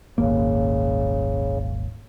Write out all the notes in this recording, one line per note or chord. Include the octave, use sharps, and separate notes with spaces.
D#1 G#1 C#3 A#3